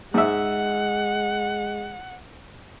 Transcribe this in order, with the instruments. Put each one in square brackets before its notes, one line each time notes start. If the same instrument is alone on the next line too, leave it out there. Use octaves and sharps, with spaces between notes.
[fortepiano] G#2 E5 [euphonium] G#3 [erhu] F#5